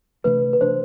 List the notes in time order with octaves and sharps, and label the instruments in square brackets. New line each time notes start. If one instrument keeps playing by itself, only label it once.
[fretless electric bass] C3 E3 A3 D4 [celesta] B4
[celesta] B4
[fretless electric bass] C3 E3 A3 D4 [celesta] C5